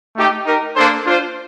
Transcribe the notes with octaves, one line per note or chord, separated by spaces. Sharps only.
A3 D#4 G4
D#4 G4 A#4
A#3 D4 A4 C5
D4 F4 C5